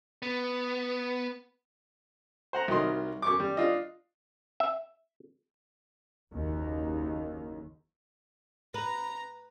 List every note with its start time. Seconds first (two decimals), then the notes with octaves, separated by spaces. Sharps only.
0.22 B3
2.53 C5 F#5 A#5
2.68 C2 D#3 F#3 D#5 C6
3.22 F#2 C#6 D6
3.40 G3
3.57 D4 F4 D#5
4.60 E5
6.32 F#1 D#2
8.74 B4 A#5